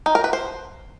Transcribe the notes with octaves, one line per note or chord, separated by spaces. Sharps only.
D#4
A#4
B4
C5